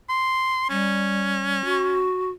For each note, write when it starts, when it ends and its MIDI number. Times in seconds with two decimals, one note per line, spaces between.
0.09 0.65 84
0.70 1.62 55
0.70 2.09 61
1.65 2.30 66